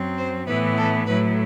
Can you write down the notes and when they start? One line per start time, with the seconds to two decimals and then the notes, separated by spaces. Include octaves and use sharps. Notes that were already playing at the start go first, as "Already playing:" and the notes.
Already playing: F#2 F#3 C4
0.18 C5
0.47 A2 E3 B3 E4 B4
0.77 A4
1.06 A2 F#3 A3 E4 B4